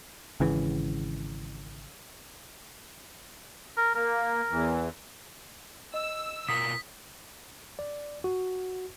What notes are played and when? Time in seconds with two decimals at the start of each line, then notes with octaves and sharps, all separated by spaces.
0.40 G#1 C#3 E3
3.77 A#4
3.95 A#3 A#4
4.50 E2 E3
5.94 D#5 E6
6.49 B2 F4 A#4 D#6 B6
7.79 D5
8.24 F#4